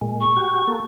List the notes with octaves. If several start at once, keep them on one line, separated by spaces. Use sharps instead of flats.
A#2 G#3
C#6
F#4 G4
A#3 A4